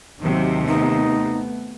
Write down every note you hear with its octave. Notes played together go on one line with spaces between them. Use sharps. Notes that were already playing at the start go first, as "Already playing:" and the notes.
D#2 C3 D#3 F#3
A3 B3 D#4